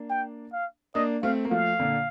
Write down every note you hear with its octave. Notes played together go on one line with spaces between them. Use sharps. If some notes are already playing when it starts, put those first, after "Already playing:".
Already playing: A#3 D4
G5
F5
A#3 D4 D#5
A3 C4 F5
A#3
F3 A3 F5
A#2 D3